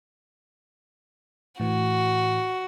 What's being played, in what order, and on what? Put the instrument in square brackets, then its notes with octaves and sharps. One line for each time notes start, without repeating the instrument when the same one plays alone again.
[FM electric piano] A2 E3 [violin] F#4